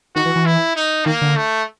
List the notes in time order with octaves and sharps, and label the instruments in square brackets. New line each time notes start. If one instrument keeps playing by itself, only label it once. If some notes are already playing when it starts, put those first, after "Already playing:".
[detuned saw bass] D#3 [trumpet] F#4
[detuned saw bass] E3
E3
[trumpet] E4
D#4
[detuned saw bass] D#3 [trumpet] A#3
[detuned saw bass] D3
[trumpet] A3